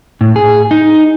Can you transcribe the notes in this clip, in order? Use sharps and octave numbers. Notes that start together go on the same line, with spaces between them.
A2
G#4
D#4